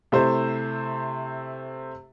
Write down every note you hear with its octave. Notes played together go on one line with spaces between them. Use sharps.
C3 A3 E4 C5